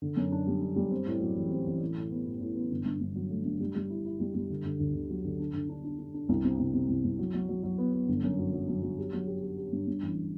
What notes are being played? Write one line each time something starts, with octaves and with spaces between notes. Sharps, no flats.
D3
F#2
D4
G3
D4
G3
C4
A2
F#3
A1
C4
A1
A2
A2
B3
A2
A2
B3
G1
G2
G2
F#3
A3
G2
G3
G3
E4
E4
G3
G3
D3
D3
D2
D3
F#3
D3
D4
D3
D4
D4
D4
D4
C2
C3
C2
C3
C2
C2
F#3
F#3
F#3
F#3
B3
B3
G1
F#2
F#3
F#3
F#3
F#3
G4
F#3
G4
G4
G4
G2
G2
A1